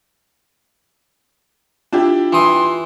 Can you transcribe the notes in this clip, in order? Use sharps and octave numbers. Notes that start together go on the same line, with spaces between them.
D4 E4 F4 G4
E3 C6 D#6